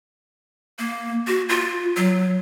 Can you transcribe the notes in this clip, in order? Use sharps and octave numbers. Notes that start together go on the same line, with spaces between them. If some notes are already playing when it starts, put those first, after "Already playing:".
A#3
F#4
F4
F#3